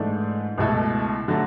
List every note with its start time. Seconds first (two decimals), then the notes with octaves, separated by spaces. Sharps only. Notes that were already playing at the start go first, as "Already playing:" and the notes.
Already playing: G#2 E3 A3 D4
0.58 C#2 B2 A3 E4 A4
1.28 D3 F#3 A3